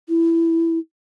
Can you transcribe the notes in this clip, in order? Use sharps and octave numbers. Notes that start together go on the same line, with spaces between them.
E4